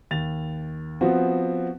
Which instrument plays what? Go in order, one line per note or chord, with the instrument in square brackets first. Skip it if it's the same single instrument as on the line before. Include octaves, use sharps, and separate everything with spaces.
[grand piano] D#2 A6 F7
F3 B3 C4 F#4